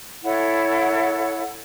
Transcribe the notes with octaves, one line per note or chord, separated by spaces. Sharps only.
E4 A4 C#5 F#5